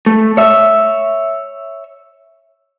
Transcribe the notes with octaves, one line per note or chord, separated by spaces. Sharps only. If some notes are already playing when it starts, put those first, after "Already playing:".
A3
C#5 E5